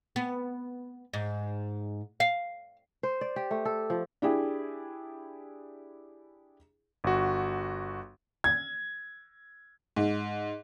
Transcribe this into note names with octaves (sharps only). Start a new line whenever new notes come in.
B3
G#2
F5
C5
D5
G4
A3
A4
F3
D4 E4 G4 G#4
G1 F#4
G#6
G#2